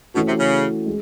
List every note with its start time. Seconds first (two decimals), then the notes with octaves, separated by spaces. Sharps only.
0.14 B2 E3 A3 C#4 F#4
0.26 C3
0.39 C#3
0.86 G#3